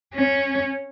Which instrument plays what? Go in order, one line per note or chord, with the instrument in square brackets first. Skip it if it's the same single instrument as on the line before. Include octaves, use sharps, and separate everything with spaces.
[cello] C#4